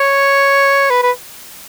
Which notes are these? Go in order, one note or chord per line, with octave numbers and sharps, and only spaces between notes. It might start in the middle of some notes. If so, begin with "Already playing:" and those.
Already playing: C#5
B4
B4